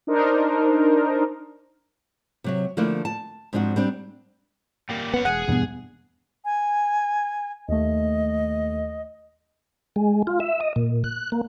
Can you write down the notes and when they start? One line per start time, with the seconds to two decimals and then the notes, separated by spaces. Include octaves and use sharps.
0.07 D4 D#4 A#4 C5
2.44 C3 F#3 E5
2.77 D3 F3 A3 A#3 D4 E4
3.05 A5
3.53 G#2 F3 C4 D4 F4 F#4
3.76 G3 C4 D4
4.90 G3 A#3
5.14 B3 C#4 F#5
5.25 E1 G#4 F#5
5.48 E2 G2 B2 B3
6.45 G#5
7.68 D#2 A3 D#5
9.96 G#3
10.27 F4
10.40 E5
10.61 D#5
10.76 A#2
11.04 F#6
11.32 A#3